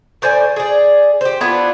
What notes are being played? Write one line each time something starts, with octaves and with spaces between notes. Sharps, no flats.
A2 C5 D5 G#5
G#4 D5
G4 C5
B3 D4 E4 F4